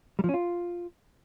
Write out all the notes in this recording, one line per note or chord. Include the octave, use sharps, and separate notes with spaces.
G3
F3
C#4
F4